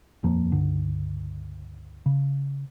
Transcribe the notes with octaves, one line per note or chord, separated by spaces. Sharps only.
D#1 F2 F3 A#3
C#2 G2 D3
C#3